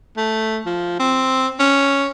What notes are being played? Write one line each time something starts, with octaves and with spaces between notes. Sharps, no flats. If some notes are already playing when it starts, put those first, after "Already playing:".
A3
F3
C4
C#4